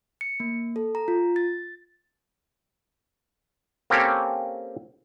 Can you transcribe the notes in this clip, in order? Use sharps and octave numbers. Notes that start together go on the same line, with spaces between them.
C#7
A#3
A4
A#5
F4
A6
A#3 C4 C#4 G4 A4 C#5